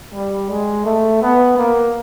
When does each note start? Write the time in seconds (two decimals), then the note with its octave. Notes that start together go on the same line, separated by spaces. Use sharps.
0.14 G3
0.50 G#3
0.85 A3
1.22 B3
1.57 A#3